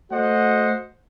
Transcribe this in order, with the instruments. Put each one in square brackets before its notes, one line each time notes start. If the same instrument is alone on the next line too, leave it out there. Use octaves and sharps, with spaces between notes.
[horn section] A3 F#4 C5 D#5 F#5